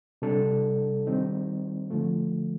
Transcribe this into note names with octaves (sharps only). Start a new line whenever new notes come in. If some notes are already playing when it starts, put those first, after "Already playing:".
C3 G3 D4 A4
D#3 G3 C4 D#4
D3 F3 A3